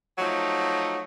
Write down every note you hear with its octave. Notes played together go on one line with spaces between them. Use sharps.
F3 F#3 A3 D#4